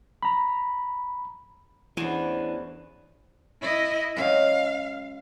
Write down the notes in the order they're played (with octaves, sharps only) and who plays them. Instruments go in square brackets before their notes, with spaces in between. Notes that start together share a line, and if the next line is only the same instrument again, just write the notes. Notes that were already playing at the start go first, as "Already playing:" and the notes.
[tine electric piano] A#5 B5
[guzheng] E2 [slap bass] E3 [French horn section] A3 C#4 D4 [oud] F#4 C5
[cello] E4 D#5
[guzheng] C#3 F#3 G#3 [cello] F5